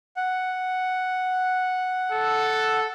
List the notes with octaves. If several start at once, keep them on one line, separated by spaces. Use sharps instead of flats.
F#5
A4